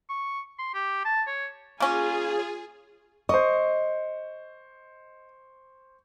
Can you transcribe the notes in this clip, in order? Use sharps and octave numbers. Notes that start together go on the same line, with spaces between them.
C#6
C6
G4
A5
C#5
A#3 C#4 F4 G#4 G#5
C5 D#5 C#6